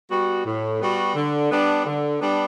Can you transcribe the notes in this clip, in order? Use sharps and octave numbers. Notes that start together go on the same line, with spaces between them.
G3 B3 F#4
A2
G3 B3 F#4
D3
G3 B3 D4
D3
G3 B3 D4